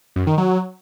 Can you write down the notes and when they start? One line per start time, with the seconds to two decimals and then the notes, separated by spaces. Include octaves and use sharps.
0.16 F#2
0.27 D#3
0.38 F#3